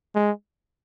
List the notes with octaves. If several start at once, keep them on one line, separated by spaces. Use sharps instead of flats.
G#3